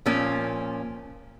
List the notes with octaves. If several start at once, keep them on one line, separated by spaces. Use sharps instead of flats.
A#2 F3 A#3 C#4